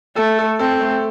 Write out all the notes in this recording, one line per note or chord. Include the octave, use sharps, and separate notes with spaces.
A3 A4
A4
C4 A4
A3